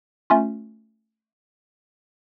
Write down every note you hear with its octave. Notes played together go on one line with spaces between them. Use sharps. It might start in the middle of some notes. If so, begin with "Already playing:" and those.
A3 C#4 F4